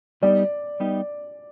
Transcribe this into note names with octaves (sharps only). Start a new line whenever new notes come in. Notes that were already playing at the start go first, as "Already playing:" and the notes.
G3 B3 D#4 G4 D5
G3 B3 D#4 G4